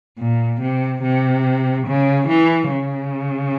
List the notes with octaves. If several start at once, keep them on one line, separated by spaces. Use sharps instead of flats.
A#2
C3
C3
C#3
E3
C#3